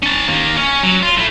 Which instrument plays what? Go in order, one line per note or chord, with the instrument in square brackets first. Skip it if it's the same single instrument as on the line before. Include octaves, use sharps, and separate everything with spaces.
[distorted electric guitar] C#4 A5
D#3 A#3
C#4
F#3
F4
A3 E4